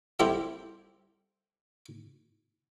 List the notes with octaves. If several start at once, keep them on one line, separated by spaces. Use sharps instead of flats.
G3 C4 E4 G4 A4 E5